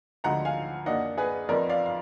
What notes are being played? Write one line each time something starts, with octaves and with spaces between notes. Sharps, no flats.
D2 D3 F3 G#3 F#5 A#5
F5 G#5
F#2 D#3 A#3 D4 D#5 F#5
G#4 B4
F2 F3 B3 D#4 A#4 D5
D5 F5
F5